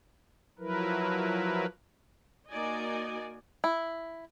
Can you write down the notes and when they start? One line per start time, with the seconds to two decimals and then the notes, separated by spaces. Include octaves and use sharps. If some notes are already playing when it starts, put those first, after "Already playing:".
0.59 F3 F#3 E4 A#4 B4
2.48 A#3 D#4 F#4 D5 D#5 G#5
3.64 E4